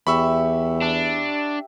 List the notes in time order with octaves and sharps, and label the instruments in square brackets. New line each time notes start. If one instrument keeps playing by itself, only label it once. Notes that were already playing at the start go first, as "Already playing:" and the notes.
[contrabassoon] E2 [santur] G4 E5 [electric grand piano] B5 C#6 E6
[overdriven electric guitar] D4